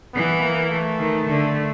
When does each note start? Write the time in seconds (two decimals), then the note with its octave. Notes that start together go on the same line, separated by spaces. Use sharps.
0.14 E3 B3
0.42 A#3
0.71 A3
0.99 D#3
1.28 D3